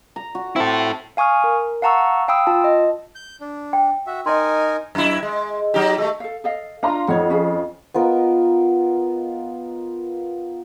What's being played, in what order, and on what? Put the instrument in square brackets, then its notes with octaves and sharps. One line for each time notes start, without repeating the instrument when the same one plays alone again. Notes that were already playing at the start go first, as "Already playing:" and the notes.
[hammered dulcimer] A#5
F#4
[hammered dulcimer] C4 [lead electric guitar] E4 A4
[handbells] F5 G#5 C#6 D#6 F6
A#4
F5 F#5 A5 A#5 C#6 E6
F5 G5 B5 D#6 E6
F4 A5
D#5
[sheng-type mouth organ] G6
D4
[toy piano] G5
[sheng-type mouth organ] F#4 E5
[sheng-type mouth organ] D#4 A#4 G#5 [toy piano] D#5 C6
[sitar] F#2 E4
G#3
F#3 D#4 G4
G#3 A3
[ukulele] A4 F5
A4 D#5 F5
[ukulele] D4 F4 [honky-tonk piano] F5 A#5 C6
[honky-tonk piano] F2 [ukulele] D#4 C#5 F#5
[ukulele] C#4 G#4 F5
[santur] B3 F4 A#4 D#5